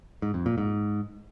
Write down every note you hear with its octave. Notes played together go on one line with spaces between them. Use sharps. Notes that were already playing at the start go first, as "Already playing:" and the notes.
G#2
F2
A#2
G#2